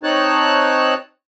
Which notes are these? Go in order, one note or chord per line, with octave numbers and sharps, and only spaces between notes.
C4 D#4 C#5 A5 F#6